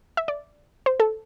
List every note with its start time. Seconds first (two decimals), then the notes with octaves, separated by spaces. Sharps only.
0.17 E5
0.28 D5
0.86 C5
1.00 A4